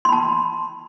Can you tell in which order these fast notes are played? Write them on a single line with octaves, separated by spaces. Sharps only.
C6 B5 A5